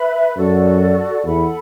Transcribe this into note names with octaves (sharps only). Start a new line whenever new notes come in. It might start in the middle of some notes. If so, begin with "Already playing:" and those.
Already playing: B4 E5 B5
F#2 F#4 A4 D5
E2 A4 F#5 B5